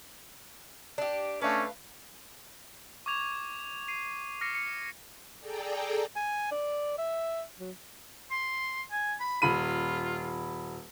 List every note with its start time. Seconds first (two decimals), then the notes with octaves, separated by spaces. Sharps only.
0.98 D4 G4
1.41 A3 C#4 D4 B4 F5
3.06 C#6 D6 G#6 F7
3.88 C7 D#7
4.41 D6 F6 A#6 C7 C#7
4.55 C#7
5.39 G#4 A4 D5 G5 A#5
6.16 G#5
6.51 D5
6.98 E5
7.59 F#3
8.31 C6
8.91 G#5
9.20 B5
9.42 D#1 F4 B5 D#7